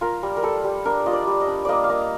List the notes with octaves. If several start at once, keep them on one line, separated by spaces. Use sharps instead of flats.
F4 A#4
G3
A#4
G3 A4
G3
D4 A#4
F4 D#5
D5
G3
D#5
D4
A#3 D5 D#5
F5
A#3 D#5